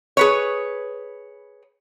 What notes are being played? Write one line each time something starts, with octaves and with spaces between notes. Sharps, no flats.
G#4 B4 C#5